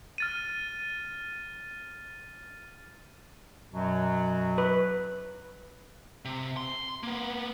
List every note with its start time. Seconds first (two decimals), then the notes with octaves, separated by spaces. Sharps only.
0.18 F6 A6 D#7
3.72 F#2 B2 F#3
4.58 B4
6.25 C3
6.57 C6
7.03 A#3 B3